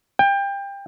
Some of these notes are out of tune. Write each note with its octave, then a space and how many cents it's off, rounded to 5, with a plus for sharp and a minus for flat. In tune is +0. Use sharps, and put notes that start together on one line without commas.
G5 +25